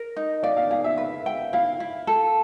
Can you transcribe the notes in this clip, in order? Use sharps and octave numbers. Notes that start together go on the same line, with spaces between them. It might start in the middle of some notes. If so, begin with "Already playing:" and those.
Already playing: A#4
D#4
D5 F5
F5
G#4 F5
E5
B4
G5
E4 F5
E4
A4